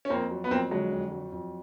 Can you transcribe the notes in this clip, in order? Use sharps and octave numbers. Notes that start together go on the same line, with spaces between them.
C#4
F2 A#3 C4
F#3
B3
F2 A#3 C4
D3 F#3 G#3
F2
F#3
F2